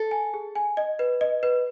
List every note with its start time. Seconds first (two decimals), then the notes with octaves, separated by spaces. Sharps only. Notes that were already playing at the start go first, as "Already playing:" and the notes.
Already playing: A4
0.11 G#5
0.34 G#4
0.55 G#5
0.77 D#5
0.99 B4
1.21 D#5
1.43 B4